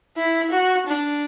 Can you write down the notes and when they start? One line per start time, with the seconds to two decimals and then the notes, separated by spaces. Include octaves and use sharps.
0.17 E4
0.51 F#4
0.87 D4